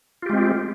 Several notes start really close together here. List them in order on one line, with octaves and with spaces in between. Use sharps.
F4 G4 G#3 C4